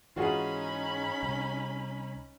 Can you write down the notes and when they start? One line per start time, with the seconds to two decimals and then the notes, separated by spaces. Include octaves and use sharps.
0.16 G#2 E3 C#4 D#4 F4 F#4 G#4 B5
1.23 C2